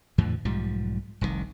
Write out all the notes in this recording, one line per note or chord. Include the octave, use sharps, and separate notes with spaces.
E2 A2 D3 F3
B1 G#2 F3 G3
F1 C2 A#2 D#3